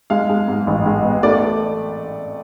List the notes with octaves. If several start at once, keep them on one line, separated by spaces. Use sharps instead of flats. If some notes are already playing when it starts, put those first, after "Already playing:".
G#3 F5
G#3
G#2
A1
G#3
B3
A3 D5